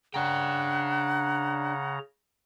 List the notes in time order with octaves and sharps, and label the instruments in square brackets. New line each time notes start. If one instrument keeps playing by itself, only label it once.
[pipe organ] C#3 A#5 [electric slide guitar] D4 G5 [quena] F#5